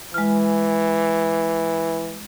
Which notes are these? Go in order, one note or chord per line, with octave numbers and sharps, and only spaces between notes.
E3 G#3 F6